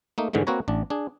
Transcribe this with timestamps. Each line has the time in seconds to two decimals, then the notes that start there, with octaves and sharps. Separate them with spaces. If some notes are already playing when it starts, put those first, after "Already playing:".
0.18 A3 A#3 D#4
0.33 G#2 D3 E3 G#3 A3
0.47 A#3 C4 F#4 B4 C#5 A#5
0.68 A1 D4
0.90 D4 G#4